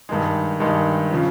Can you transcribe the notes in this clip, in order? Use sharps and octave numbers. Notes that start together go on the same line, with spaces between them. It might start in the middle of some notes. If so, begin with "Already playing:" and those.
G2 D#3 G#3
G2 D#3 G#3
C#3 F3